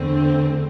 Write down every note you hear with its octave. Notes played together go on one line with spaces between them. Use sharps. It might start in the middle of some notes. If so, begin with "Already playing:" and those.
Already playing: E2 D3 A3 C4